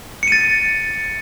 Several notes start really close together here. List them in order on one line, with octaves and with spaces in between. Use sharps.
C#7 D#7 A6